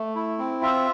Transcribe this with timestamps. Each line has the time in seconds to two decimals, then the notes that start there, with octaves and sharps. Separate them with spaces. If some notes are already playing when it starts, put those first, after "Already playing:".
Already playing: A3
0.15 E4
0.38 C4
0.62 F4 E5